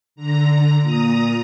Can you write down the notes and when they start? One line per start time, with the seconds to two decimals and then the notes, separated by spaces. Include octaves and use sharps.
0.16 D3 A#5
0.81 A#2 A#5 D#6